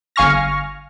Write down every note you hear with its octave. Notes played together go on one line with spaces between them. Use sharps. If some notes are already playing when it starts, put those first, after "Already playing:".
G1 F5 G#5 C#6 F6 A#6